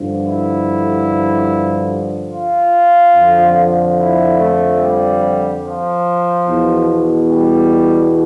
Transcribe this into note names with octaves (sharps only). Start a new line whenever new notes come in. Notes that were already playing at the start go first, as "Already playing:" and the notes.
Already playing: G2 D3 F3
E4
F4
F2 D3 F3
E4
A3
G3
F3
E2 B2
G3